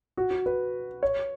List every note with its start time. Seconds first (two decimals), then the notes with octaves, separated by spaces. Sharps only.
0.17 F#4
0.31 F#4
0.46 B4
1.03 C#5